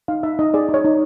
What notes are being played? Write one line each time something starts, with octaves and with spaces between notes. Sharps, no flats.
D#4 F5
D#4 E5
D#4 D#5
G#4 D5
D#4 C#5
D#4